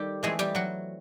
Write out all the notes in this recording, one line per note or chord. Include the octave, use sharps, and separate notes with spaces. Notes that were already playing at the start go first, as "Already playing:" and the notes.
Already playing: D#3 G3 G4 A4
E3 G#3 A3 C4 G#4
G3 G4
F#3 F#4